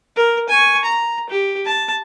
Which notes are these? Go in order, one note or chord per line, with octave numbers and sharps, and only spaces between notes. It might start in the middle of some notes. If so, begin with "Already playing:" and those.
A#4
G#5 C#6
A#5
G4
A5